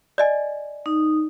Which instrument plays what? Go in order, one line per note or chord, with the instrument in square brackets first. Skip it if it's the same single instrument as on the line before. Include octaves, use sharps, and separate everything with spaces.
[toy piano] D5 D#5 G#5
[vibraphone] D#4